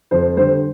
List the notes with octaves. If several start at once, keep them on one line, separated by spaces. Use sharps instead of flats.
F2 C5
D3 G3 C5